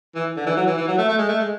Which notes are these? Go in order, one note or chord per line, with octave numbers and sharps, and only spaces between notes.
E3
D3
E3
F#3
E3
E3
F#3
A3
A3
G#3
A3
G#3